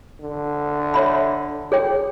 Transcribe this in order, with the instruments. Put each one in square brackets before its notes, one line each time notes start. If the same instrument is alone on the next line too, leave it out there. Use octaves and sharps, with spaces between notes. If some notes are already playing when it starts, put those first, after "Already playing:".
[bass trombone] D3
[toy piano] C#5 E5 B5
G#4 C#5 G5